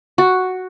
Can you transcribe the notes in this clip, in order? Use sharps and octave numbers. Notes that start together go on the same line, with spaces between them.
F#4